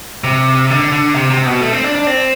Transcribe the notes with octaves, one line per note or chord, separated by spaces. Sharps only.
C3
D3
D3
C3
C3
B2
A3
C4
D4
D4
C4